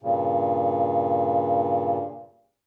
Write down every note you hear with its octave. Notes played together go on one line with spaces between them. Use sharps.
G2 A#2 C#3